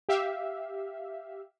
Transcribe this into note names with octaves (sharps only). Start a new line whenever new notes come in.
G4 E5 F5